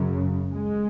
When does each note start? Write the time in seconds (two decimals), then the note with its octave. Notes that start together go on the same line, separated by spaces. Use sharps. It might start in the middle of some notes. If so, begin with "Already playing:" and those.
Already playing: F#2 C#3
0.51 G#3